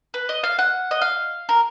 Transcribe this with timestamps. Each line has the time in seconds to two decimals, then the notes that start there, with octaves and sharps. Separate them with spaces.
0.14 B4
0.29 D#5
0.44 F5
0.59 F#5
0.91 D#5
1.02 F5
1.49 A#4